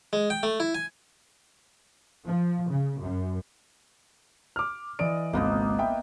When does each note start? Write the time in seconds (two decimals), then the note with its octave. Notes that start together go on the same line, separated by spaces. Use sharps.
0.13 G#3
0.30 G5
0.43 A3
0.60 E4
0.75 G#5
2.26 F3
2.70 C#3
3.00 F#2
4.56 D6 F6
4.99 E3 D5 D#5 D7
5.33 G#1 C#2 A#3 B3 D#4
5.79 E5 G5 B5